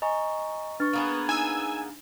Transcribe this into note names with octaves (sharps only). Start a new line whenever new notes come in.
D#5 G#5 A#5 C#6
D4 B4 C#6 F6 A6
A#3 B3 G#4
D#4 G#5 E6 G#6